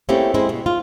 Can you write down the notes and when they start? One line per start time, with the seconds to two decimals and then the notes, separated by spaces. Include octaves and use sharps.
0.09 A3 A#3 C4 C#4 E4 G4
0.34 G#3 C4 E4
0.49 B2
0.66 F4